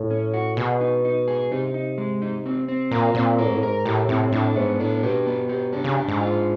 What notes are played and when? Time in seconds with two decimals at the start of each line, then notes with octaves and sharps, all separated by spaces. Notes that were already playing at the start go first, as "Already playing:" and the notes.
Already playing: A2
0.10 C#4
0.34 F#4
0.57 B2 G#4
0.81 D#4
1.05 D#4
1.28 G#4
1.51 C3 D#4
1.74 D#4
1.98 G#3
2.22 D#4
2.46 C4
2.68 C4
2.91 A#2 A#4
3.15 A#2 C4
3.38 A2 A#4
3.46 G#2
3.53 A2
3.62 G#2 A#4
3.86 A2 G4
4.09 A2 C4
4.32 A2 D4
4.56 G#2 B3
4.79 A2 D4
5.03 B2 G4
5.27 B3
5.49 G4
5.73 C#3 D4
5.84 C#3
5.97 D4
6.08 G#2
6.20 F4